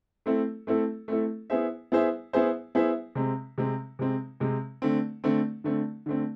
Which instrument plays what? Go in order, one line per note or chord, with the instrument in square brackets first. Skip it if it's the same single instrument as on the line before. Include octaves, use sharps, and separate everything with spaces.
[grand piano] A3 C4 E4 A4
A3 C4 E4 A4
A3 C4 E4 A4
B3 E4 G#4 C5 E5
B3 E4 G#4 C5 E5
B3 E4 G#4 C5 E5
B3 E4 G#4 C5 E5
C3 G#3 C4
C3 G#3 C4
C3 G#3 C4
C3 G#3 C4
D3 A3 C4
D3 A3 C4
D3 A3 C4
D3 A3 C4